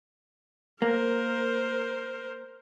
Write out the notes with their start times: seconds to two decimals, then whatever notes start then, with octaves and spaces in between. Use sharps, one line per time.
0.82 A#3 A#4 C5